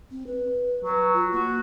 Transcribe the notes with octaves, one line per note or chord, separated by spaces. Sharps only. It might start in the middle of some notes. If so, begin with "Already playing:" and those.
C4
B4
F#3 B4
F4
A#3 F#4